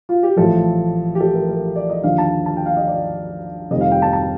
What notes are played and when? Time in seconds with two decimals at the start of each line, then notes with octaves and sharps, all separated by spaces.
0.09 F4
0.23 G4
0.36 A1 A2 F3 A4
1.15 G4
1.20 A4
1.34 A#4
1.48 A#4
1.76 D5
1.89 D#5
2.03 D#2 D3 F3 F5
2.18 A5
2.46 A5
2.57 G5
2.66 F5
2.77 D#5
2.87 D5
3.71 F1 F2 C3 D#3 G3 D#5
3.81 F5
3.91 G5
4.02 A5
4.13 A5